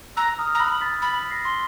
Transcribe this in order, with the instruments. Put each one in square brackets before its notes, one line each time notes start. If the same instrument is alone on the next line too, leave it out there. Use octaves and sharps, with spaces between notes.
[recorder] A#5 [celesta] E6 F#6
[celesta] D#6 F6
[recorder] A#5
[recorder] B5 [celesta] E6 F#6
[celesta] A6 B6
[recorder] B5 [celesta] A6 B6
[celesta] A#6 C7
[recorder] C6